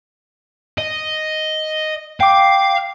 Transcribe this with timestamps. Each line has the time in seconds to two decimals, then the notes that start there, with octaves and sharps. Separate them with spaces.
0.78 D#5
2.20 F5 G5 D6